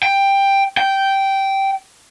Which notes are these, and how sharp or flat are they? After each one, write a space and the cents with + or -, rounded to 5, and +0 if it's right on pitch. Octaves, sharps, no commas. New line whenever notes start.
G5 +10
G5 -10